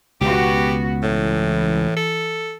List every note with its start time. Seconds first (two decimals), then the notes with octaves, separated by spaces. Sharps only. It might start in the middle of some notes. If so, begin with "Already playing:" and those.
0.21 C#2 B2 B3 F#4 G4
1.03 A2 E3
1.96 A4